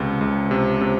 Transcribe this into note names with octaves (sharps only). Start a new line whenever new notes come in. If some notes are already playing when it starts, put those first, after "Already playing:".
Already playing: C#2 C3
C#2
C3
C3